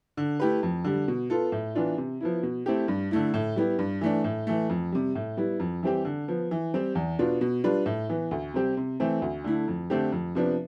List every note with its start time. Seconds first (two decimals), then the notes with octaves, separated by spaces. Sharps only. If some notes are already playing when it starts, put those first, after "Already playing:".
0.17 D3
0.40 A3 E4 G4 B4
0.63 F2
0.84 D3 G3
1.08 B2
1.30 B3 F4 A4
1.52 A2
1.75 E3 B3 D4 F4
1.98 C3
2.21 F3 B3 E4
2.43 B2
2.66 A3 C4 E4 G4
2.88 G2
3.11 D3 A3 E4
3.34 A2
3.56 G3 B3 E4 G4
3.79 G2
4.01 E3 A3 D4
4.24 A2
4.47 E3 A3
4.69 F2
4.92 C3 G3
5.15 A2
5.37 G3 B3 E4
5.60 F2
5.83 E3 G3 C4 G4
6.05 D3
6.28 F3 B3
6.51 E3
6.74 G3 C4 G4
6.95 E2
7.19 B2 B3 D4 F4
7.41 B2
7.64 G3 D4 F4 B4
7.86 A2
8.09 E3 B3
8.31 D2
8.54 C3 G3 C4 G4
8.77 C3
9.00 E3 A3 C4
9.22 D2
9.44 D3 A3 E4
9.68 F2
9.90 D3 A3 C4 G4
10.12 F2
10.35 C3 F3 B3 D4